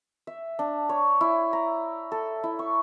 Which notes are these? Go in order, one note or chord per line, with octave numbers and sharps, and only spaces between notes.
E5
D4
C#5
E4
A#5
A4
E4
C#6